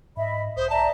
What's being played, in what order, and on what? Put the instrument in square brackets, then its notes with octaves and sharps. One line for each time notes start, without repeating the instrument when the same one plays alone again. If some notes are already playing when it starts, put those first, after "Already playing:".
[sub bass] G#2 [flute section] D#5 E5 B5
[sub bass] B1 [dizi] C5 [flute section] D#6
[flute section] D5 E5 A#5 [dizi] A5